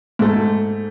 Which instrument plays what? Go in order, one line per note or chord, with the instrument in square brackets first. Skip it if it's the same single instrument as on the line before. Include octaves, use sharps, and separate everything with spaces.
[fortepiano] G#2 A3